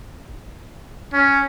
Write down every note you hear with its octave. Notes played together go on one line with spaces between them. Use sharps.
C#4